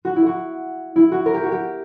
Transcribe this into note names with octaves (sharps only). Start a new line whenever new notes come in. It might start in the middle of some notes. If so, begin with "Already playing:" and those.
F#4
E4
F#4
E4
F#4
A#4
G4
F#4
G4